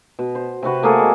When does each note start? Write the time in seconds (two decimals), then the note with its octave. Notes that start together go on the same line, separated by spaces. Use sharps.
0.19 B2
0.35 C5
0.63 C3 C4 F#4 B4
0.82 A3 A#3 G#4 A4
0.99 G#3